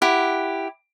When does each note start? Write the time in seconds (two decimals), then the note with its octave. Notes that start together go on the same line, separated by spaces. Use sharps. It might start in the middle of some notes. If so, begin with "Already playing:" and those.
0.02 E4 G4 F#5